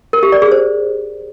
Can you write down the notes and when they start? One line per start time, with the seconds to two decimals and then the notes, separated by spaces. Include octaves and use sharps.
0.13 A#4
0.23 G4
0.32 D5
0.42 G#4
0.52 C5